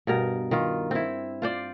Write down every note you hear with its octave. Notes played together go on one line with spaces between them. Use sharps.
G2 B2 A#4
D#3 F4
C4 E4
F4 C5 D5